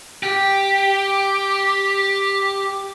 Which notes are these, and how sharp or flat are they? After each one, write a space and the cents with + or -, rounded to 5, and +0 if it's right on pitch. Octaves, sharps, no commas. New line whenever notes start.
G4 +5